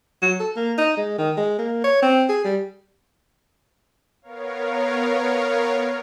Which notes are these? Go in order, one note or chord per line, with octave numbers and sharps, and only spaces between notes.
F#3
A4
A#3
D#4
G#3
D#3
G#3
A#3
C#5
C4
G#4
G3
B3 A#4 C#5 F5